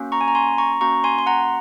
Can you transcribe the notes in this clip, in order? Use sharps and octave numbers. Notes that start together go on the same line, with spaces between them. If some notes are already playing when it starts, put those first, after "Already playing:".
Already playing: A#3 C#4 F#4
A#5 C#6
G#5
A#5
G#5 C6
A#5 C#6
A#3 C#4 F#4 A#5 C#6
G#5 C6
C6
F#5 A#5